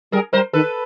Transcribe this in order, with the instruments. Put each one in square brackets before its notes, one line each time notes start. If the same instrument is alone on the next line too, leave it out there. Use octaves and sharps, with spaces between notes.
[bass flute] G3 [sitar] G#4 A#4
[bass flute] G3 [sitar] A#4 C5
[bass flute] D#3 [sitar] A4 B4